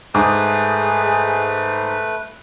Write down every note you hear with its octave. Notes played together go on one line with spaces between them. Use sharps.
G#2 A3 G#4 B4 D6 D#6